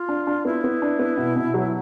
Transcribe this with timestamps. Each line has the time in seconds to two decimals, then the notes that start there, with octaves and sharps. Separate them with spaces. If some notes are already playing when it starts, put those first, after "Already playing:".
Already playing: F4
0.09 D4
0.27 D4
0.45 B3 E4
0.64 B3
0.82 D4
0.99 B3
1.17 B2
1.36 B2
1.54 F#3